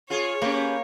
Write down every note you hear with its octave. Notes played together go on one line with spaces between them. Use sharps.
F4 G#4 C#5
A#3 C#4 G4 B4